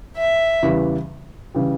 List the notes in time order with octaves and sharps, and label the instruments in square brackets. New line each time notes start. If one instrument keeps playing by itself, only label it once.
[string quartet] E5
[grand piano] E2 C#3 E3 G3
C#3 E3 G3